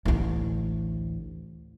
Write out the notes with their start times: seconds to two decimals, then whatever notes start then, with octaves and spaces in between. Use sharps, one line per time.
0.05 A1 D2